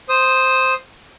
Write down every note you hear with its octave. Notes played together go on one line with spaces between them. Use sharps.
C5 D#6